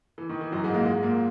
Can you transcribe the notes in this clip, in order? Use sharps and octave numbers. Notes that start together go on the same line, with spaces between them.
E3
D#3
E3
F#2 F#3
G#2 G#3
A#2 A#3
G#2 G#3
A#2 A#3